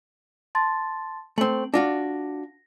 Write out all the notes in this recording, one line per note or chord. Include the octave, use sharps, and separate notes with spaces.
A5 C6 A6
A3 C4 F#7
D4 F4 F#4 A#6